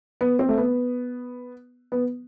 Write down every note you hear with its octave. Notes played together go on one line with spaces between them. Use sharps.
B3
C4
A3
B3
B3